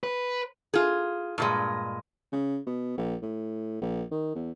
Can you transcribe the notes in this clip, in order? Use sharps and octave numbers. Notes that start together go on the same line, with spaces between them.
B4
F4 G#4
G2 A#2 G#3
C#3
B2
A#1
A2
A#1
D#3
E2